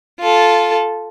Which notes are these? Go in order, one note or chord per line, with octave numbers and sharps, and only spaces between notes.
F4 A4